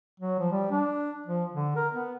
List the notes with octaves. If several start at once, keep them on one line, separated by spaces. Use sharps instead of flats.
F#3
F3
G3
D4
F3
D3
A#4
B3